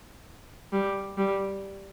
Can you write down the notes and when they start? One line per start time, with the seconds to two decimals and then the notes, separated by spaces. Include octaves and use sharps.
0.73 G3
1.17 G3